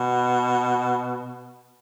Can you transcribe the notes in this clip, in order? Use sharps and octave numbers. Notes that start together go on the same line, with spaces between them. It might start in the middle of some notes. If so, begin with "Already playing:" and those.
Already playing: B2